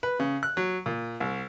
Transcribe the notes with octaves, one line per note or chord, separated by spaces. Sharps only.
B4
C#3
F#6
F#3
A#2
C2